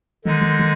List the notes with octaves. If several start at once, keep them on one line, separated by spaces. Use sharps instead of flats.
D3 D#3 G#3 D#4
D#3
D#3